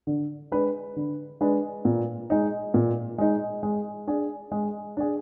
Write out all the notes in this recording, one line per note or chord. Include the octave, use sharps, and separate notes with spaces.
D3
G#3 D4 G#4 B4
D3
G#3 D4 G#4 B4
A#2
G#3 D#4
A#2
G#3 D#4
G#3
D4 G#4
G#3
D4 G#4